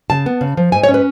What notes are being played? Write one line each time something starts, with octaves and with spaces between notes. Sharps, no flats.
C#3 A5
B3
C#3
F3
G#2 G#5
C#5
C#4
B4